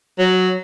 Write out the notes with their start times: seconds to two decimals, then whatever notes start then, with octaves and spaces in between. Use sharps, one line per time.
0.19 F#3